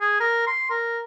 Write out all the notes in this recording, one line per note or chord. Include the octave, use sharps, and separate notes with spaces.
G#4
A#4
C6
A#4